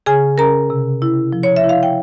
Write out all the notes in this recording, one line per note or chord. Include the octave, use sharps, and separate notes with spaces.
C#3 G#4 G#5
C#4 A#4 A#5
C3
E4
F3
C#5
E5
E4
F5
G5